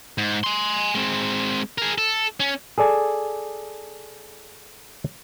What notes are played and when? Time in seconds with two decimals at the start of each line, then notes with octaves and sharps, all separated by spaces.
0.18 G#2
0.44 G#5 C6
0.95 G#3 C4
1.78 G#4 A#4
1.98 A4
2.40 C#4
2.78 G#4 A4 D5 G#5 A5